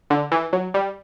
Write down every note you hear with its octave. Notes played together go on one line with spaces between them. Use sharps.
D3
E3
F#3
G3